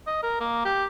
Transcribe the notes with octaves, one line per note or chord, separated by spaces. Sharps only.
D#5
A#4
A#3
G4